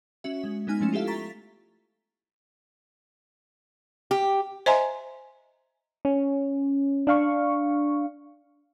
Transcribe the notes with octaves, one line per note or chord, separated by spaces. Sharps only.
C#4 F#4 E5
G#3
G#3 B3 D#4 G#5 F6
F3 A3 C#4 E4
F4 G4 A4 E5 F5
A#5 C#6 A6 B6
G4
C5 D#5 E5 G#5 A#5 C6
C#4
D4 F5 C#6